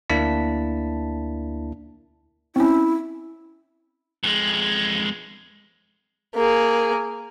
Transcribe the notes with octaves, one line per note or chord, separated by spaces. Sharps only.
D2 A#3 D4 E4 A5 B6
C4 C#4 E4
F2 G#3
A#3 G#4